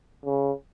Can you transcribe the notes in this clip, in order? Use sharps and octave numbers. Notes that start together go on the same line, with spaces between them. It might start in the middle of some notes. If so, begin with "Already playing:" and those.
C#3